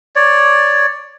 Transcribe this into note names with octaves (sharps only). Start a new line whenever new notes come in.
C#5 D5